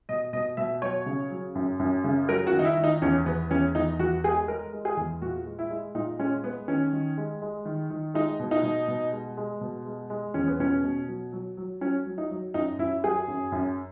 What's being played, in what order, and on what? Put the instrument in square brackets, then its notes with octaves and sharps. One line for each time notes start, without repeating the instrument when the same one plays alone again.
[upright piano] B2 D#5
B2 D#5
B2 E5
F#3 C#5
C#3
F#3
F#2
F#2
C#3
F#3 A#4
F#4
D#3
D#4
E4
D#3
D#4
E2 C#4
E2 B3
E2 C#4
E2 D#4
E2 F#4
G#3 G#4
G#3 A#4
G#3
G#4
E2
A#2 F#4
G#3
E4
G#3
A#2 D#4
G#3 C#4
G#3 B3
D#3 C#4
D#3
G#3
G#3
D#3
D#3
G#3 D#4
B2
D#4
B2
B2
G#3
G#3
B2
G#3
G#3
E2 C#4
B3
B2 C#4
B2
F#3
F#3
F#3
F#3 C#4
F#3
D#4
F#3
F#2 D#4
F#2 E4
F#3 G#4
F#2
F#2